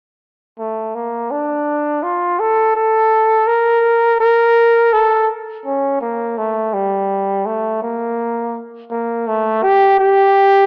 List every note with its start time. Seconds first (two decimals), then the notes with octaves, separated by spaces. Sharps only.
0.59 A3
0.95 A#3
1.31 D4
2.03 F4
2.40 A4
2.76 A4
3.48 A#4
4.20 A#4
4.93 A4
5.66 C#4
6.01 A#3
6.38 A3
6.74 G3
7.46 A3
7.82 A#3
8.91 A#3
9.28 A3
9.63 G4
10.00 G4